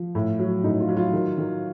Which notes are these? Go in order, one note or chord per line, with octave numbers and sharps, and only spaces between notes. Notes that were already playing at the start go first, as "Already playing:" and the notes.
Already playing: F3
A2
F#3
A2 D#4
F4
F#3
F4
D#3
D#3